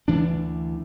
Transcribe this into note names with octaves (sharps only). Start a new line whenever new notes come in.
D2 E3 D4